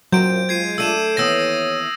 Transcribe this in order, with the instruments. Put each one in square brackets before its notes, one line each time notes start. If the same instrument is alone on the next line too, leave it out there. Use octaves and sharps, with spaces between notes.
[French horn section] F#2 A#2 [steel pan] F#3 [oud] A#3 C4 [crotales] G6 D7
[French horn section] G#3 F4 [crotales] G#6 C7 D#7
[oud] A3 D4 [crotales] E6 D#7 E7
[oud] D#2 E3 B3 [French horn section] C#5 [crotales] D#6 E6 A#6